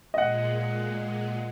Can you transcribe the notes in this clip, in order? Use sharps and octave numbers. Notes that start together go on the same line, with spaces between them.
A#2 G#3 D#5 F#5